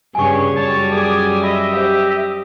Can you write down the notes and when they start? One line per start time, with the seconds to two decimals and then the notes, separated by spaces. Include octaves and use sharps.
0.15 G2 C#3 C#5 G#5 C#6
0.56 F#2 G3 C#5 A5
0.92 G#4 A4 D5 G#5 D#6
1.43 D#5 E5 B5
1.74 G4 C5 D#5 F5